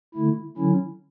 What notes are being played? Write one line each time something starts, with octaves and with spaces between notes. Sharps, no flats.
D3 A3 E4
D3 F#3 C#4 E4